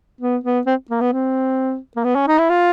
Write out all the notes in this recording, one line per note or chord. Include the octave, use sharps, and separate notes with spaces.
B3
B3
C4
A#3
B3
C4
A#3
B3
C#4
D#4
E4
F4